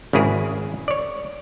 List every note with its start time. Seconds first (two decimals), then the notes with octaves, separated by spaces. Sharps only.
0.13 G#1 C#3 E4 G#4 A#4
0.88 C#5 D5